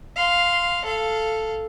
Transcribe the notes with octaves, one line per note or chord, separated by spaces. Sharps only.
F5 C6
A4 F5